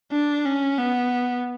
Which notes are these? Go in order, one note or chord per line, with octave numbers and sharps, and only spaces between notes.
D4
C#4
B3